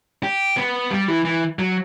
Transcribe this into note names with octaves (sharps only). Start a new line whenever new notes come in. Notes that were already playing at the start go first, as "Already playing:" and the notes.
G4
B3
G3
E3
E3
F#3